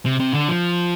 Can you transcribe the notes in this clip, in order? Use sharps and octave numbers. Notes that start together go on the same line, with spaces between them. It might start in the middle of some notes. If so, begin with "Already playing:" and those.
C3
C3
D3
F3